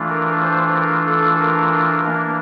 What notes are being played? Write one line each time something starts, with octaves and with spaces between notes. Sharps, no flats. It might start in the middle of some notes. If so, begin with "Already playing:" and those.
Already playing: E3 A3 D4 F4
A#4
C5
A#4
A4
A#4
E3 A#3 D4